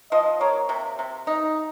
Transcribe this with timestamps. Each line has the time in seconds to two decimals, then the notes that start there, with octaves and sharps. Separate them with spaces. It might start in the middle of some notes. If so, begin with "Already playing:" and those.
0.12 F3 D#5
0.40 A#3 C#5
0.69 C3
0.99 C3
1.27 D#4